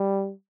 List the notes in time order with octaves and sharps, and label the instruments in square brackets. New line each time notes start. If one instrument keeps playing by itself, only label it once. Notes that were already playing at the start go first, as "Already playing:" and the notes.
Already playing: [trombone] G3